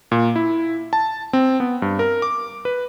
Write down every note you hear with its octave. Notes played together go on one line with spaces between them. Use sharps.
A#2
E4
A5
C4
B3
G2
A#4
D6
B4